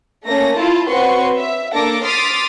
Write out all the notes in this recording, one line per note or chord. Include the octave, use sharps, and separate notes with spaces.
A3 A#3 C#4 A#6
E4 F4 A5
C4 F#4 B4 C#5 C6 C#6
E5
A#3 D4 A4 A5 D6 A#6
C6 D6 D#6 F6 A6 B6